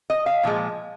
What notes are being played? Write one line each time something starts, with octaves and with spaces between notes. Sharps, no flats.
D#5
F5
A#2 F3 G#3